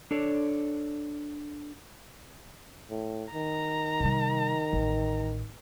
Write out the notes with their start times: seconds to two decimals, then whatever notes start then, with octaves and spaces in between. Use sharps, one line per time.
0.11 D4 A4 C#5 D5
2.90 A2
3.34 D#3 A#5
4.00 C3 G3
4.73 A1